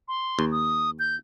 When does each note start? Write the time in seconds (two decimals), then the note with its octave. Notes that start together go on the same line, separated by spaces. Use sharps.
0.08 C6
0.39 D#2
0.52 D#6
0.99 G6